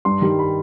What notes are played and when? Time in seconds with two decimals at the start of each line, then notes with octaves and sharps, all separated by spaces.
0.05 G2 C6
0.22 D#3 G3
0.39 B5